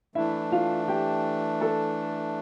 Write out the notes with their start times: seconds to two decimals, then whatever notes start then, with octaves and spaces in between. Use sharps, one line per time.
0.15 E3 A3 D4 E4 E5
0.52 F4 F5
0.88 G4 G5
1.61 A4 A5